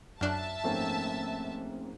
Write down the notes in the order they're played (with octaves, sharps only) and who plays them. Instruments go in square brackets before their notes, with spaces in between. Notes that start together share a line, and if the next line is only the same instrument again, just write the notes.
[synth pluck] F#2 D4 [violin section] E5 A5 [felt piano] F6 F#6
[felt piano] G#2 F3 A#3 [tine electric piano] A3 C4 C#4